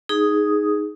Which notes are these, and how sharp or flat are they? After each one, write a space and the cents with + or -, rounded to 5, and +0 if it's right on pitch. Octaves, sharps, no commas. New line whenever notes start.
D#4 +0 G#4 +0 D#6 +5